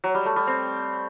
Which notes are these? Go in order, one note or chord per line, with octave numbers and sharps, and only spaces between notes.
F#3
G3
A3
G3
C4